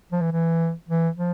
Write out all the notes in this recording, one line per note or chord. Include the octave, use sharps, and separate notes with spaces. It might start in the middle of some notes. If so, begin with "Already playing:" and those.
F3
E3
E3
E3
F3